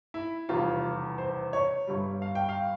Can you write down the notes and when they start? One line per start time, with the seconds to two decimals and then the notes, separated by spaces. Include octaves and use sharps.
0.14 E4
0.49 F1 E2 C#3 E3 G3 F4
1.18 C5
1.53 C#5
1.87 G1 G2 G3
2.22 F5
2.35 G5
2.49 F5